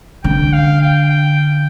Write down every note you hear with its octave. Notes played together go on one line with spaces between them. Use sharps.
D3 G5
F5
G5
G5